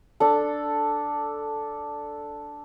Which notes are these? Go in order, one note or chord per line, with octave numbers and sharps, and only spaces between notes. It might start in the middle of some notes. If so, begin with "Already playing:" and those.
D4 A4